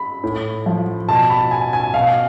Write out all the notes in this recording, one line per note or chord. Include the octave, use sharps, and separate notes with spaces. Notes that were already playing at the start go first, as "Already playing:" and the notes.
Already playing: B5
A2
F3
B2 A5
B5
G#5
G#5
B2 F5